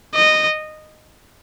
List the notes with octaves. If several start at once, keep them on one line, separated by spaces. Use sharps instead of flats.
D#5